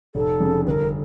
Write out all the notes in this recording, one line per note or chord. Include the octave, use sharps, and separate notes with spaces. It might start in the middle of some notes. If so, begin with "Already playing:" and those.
F1 A4
F2 C#3
G1 A#4 B4